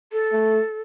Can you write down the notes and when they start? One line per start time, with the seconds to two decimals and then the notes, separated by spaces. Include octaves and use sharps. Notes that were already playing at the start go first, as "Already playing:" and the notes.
0.12 A4
0.32 A3